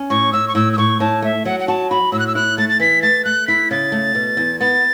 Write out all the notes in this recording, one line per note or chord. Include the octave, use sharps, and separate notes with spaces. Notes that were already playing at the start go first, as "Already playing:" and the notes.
Already playing: C#4
A2 C#6
A2 E6
C#6
A2 E6
E6
A2 C#6
A2 A5
A3 E5
F#3 F#5
F#5
F#4 A5
F#4 B5
A2 E6
F#6
E6
E4 F#6
A3 A6
A6
E3 B6
A3 A6
A3 F#6
E4 B6
C#3 A6
A3
B2
E2
B3 A6